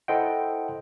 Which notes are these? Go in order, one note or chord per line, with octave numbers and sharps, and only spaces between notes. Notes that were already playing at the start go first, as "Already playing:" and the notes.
E4 A4 C5 D#5 F#5 G5